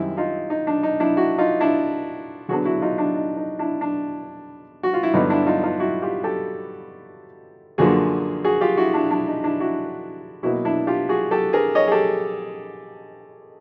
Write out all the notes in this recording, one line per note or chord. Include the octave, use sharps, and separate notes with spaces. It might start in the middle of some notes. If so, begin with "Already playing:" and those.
Already playing: F#2 D#3 G3 C4 E4
D#4 F4
D#4
D4
D#4
D4 E4
E4 F#4
D#4 F4
D4 E4
D3 F#3 B3 D4 F#4 G#4
E4 F#4
D#4 F4
D4 E4
D#4
D#4
D4 E4
D4
F#4
F4
E4
G2 D3 F#3 B3 D#4
D4 E4
D#4 F4
D#4 F4
E4 F#4
F4 G4
G4 A4
F#2 D3 F3 A#3 F#4 G#4
F#4 G#4
F4 G4
E4 F#4
D4 E4
D4 E4
D#4
D4 E4
E4 F#4
B2 F#3 A#3 E4 F#4
D4 E4
F4 G4
F#4 G#4
G4 A4
G#4 A#4
C#5 D#5
G#4
G4 A4